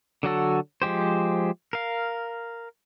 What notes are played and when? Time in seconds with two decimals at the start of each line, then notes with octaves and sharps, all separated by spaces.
0.23 D3 F#3 F#4 A4
0.82 F3 G#3 G4 C5
1.73 A#4 F5